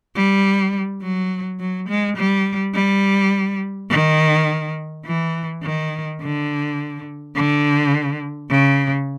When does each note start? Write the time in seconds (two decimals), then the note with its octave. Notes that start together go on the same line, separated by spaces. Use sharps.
0.16 G3
1.02 F#3
1.60 F#3
1.89 G#3
2.17 G3
2.74 G3
3.90 D#3
5.05 E3
5.63 D#3
6.20 D3
7.35 D3
8.50 C#3